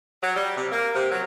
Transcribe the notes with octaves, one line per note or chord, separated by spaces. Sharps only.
F#3
G3
C3
A#3
C3
F#3